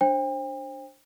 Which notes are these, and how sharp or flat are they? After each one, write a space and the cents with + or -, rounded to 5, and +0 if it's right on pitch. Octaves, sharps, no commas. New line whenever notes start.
D4 +0 C5 +25 G5 +40